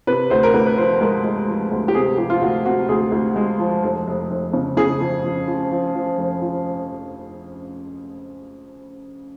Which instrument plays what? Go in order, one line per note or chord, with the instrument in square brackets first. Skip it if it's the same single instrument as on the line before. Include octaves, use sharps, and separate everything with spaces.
[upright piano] C3 B4
D2 C5
A#4
D2 B4
B4
F3 C5
G#3 A#4
G#3
F3
D2
G4
C3 G#4
F3 G4
F4
D2 F#4
C3 F#4
D2 G#4
D2
G#3
F3
F1
F1
F1
C#3
C#3 G#4
F2
F2
F3
F3
F3
F1
F3